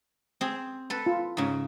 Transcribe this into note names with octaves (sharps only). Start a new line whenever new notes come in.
C4 G#4
A4 B4
F4
G#2 C#3